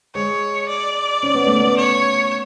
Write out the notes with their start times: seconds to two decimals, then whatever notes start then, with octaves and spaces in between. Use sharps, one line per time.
0.15 G#3 C#5
0.69 D5
1.23 C#4
1.35 B3
1.47 A3
1.58 B3
1.77 C#5